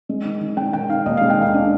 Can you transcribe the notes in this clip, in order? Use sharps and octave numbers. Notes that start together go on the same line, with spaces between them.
G#3
D#3
D#3
G#3 G5
D#3 G5
D#3 F5
D#2 D#5
G#3 F5
G5
D#3 F5
D4